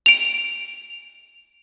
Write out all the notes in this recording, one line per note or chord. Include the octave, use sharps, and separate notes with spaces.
D7 F7